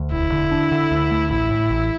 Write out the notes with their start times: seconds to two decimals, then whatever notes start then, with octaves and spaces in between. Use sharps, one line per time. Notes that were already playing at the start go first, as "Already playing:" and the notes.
Already playing: D2
0.11 E1 E4
0.32 D3
0.51 D4
0.72 D3
0.91 D2
1.11 A3
1.31 A1 E4
1.51 A2
1.70 A1